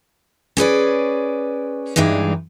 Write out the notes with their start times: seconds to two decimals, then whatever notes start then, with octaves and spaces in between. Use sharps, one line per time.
0.57 C#4 G#4 B4 D5
1.96 G2 E3 G#3 D4 D#4